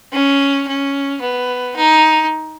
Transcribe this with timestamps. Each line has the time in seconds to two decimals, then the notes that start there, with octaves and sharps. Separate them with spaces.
0.12 C#4
0.67 C#4
1.21 B3
1.75 D#4